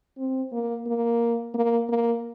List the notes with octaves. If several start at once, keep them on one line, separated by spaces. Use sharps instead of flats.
C4
A#3
A#3
A#3
A#3